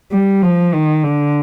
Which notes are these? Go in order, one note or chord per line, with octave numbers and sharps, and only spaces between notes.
G3
F3
D#3
D3